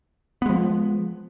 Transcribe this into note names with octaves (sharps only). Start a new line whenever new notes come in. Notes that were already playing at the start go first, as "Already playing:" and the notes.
F3 G#3 B3